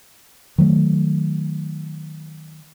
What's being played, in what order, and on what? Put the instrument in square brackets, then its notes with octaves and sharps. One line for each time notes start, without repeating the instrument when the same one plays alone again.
[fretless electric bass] D#3 F#3 A3